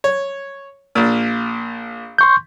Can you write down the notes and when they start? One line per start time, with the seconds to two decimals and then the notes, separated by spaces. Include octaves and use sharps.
0.04 C#5
0.95 A#1 A#2
2.18 C6 C#6 G6